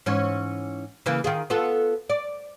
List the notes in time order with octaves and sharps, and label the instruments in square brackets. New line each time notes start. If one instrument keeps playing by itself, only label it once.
[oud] G#2 E3 C#4
C#3 E3 A#3
D#3 F4 G#4
B3 F4 A4
D5